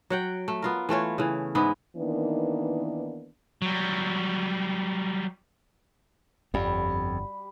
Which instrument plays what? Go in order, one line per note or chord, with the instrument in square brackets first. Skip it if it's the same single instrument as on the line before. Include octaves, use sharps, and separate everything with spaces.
[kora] F#3 F#5 G5
A3
B3 F4 A#4
E3 A3 F4 C#5
C#3 E3
G#2 G#3 B3 E4
[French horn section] D#3 E3 A#3 B3 D4 D#4
[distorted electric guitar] F#3 G3
[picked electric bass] G1 [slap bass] F2 [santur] G3 B5